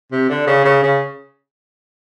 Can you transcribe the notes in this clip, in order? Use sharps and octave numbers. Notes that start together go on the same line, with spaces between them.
C3
D3
C#3
C#3
C#3